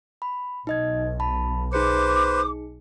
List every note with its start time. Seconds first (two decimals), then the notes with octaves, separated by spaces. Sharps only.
0.22 B5
0.67 B1 D#4 D#5 G#6
1.20 A5 B5
1.73 D#4 G#4 B4 C5 D6 C#7